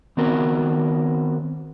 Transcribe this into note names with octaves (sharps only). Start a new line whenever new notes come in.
D#3 B3 C4 F#4 A#4